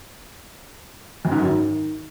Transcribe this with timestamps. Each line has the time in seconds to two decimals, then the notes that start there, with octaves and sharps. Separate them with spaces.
1.25 F2
1.32 G#2
1.38 F#2
1.45 D#3